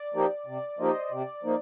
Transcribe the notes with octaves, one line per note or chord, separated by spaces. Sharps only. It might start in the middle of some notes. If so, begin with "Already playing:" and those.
Already playing: D5
F3 A#3 D#4 G4
C3 D5
F3 A#3 D#4 G4 C5 D#5
C3 D5
F3 A#3 D#4